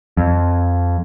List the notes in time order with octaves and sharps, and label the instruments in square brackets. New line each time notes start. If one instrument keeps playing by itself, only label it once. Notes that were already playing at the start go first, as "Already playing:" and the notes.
[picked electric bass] F2